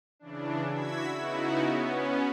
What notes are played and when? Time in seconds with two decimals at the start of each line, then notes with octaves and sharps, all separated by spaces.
0.19 C#3 E3 D4
0.73 E4 F#4 E6 G#6 B6
1.17 C#3 B3 D#4 E4 F#4
1.63 B3 C#4